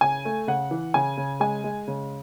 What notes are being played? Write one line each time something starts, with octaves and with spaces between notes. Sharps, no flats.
C#3 G#5
A3
C#3 F#5
E3
C#3 G#5
C#3
G#3 G#5
G#3
C#3